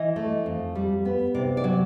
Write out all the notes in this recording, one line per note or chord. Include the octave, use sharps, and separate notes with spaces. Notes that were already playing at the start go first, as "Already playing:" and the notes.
Already playing: E3 D#5
A3
F2
G3
B3
C3 D5
D5
F#3